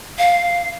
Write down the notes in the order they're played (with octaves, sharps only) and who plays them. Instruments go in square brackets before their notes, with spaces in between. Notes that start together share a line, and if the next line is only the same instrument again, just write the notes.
[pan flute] F5